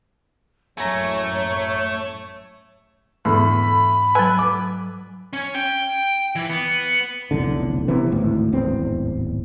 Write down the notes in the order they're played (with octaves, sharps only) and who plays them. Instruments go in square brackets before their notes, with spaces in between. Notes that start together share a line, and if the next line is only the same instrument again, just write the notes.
[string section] A1 F#2 [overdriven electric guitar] A3 [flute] C#5 [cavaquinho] G#5 A#5
[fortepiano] E2 D3 [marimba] G#2 [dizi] B5
[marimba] F#3 E6 [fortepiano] B4 G#5
[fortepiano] D6
[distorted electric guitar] C#4
G5
E3
B3
[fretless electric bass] F1 B1 E2 D3
C3 E3 B3
G#1 D2 A2
D1 G#1 E2 C4